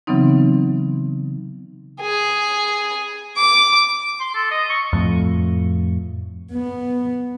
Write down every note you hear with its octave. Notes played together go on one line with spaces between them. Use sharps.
C#3 E3 F#3 B3 C4 D#4
G#4
D6
C6
A4
D#5
C#6
F2 A2
B3